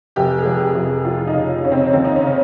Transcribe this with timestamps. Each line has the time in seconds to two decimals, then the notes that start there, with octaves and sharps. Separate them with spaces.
0.16 F1 G4
0.38 G#4
0.46 F2
0.60 G4
0.75 F1
1.05 F1 F4
1.27 D#4
1.34 C#3
1.64 C#3 C#4
1.71 C4
1.93 D#2 C4
2.04 D#4
2.15 C#4
2.23 C#3